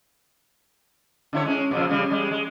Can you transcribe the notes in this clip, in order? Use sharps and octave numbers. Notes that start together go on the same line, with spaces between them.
D3 E4 C#5
G#3 C#4
A#2 C#3 F3
C#3 G3
G3 G#3
G#3